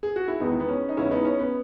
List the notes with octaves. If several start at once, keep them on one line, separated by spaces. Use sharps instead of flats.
G#4
F#4
E4
E2 D#3 G#3 B3 D#4
B3
C#4
D#4
E2 C#3 G#3 C#4 E4
B3 D#4
C#4
B3